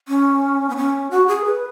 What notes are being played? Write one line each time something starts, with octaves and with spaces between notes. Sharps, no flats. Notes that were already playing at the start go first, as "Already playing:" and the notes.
C#4
B3
C#4
F#4
G#4
B4